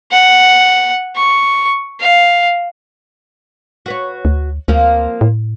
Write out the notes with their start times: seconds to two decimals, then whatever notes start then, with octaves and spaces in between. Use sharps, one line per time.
0.12 F#5
1.16 C#6
2.01 F5
3.86 F#4 B4 C#5
4.25 D2
4.68 D2 F3 A#3 C4
5.21 A2